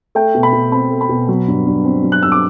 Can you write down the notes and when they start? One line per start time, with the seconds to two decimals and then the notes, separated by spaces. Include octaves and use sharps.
0.15 A3 G5
0.35 B2
0.43 B5
0.53 B2
0.72 C4 B5
0.90 A3
1.01 B5
1.09 B2
1.28 F#3
1.48 G2
1.67 G2
1.85 C4
2.04 F#3
2.12 F#6
2.23 G2 E6
2.32 D6